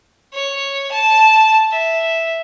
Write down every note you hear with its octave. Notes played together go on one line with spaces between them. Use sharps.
C#5
A5
E5